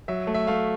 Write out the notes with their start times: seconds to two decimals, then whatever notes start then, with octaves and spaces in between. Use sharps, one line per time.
0.08 F#3 E5
0.27 A3
0.34 E5
0.47 A3 F5